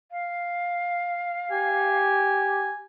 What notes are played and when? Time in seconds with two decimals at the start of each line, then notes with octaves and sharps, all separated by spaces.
0.11 F5
1.51 G4 G#5